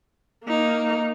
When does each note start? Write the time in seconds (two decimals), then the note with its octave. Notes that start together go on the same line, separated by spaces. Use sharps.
0.45 A#3 D#4